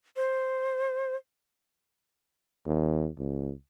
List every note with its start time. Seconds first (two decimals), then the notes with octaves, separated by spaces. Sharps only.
0.16 C5
2.66 D#2
3.18 C#2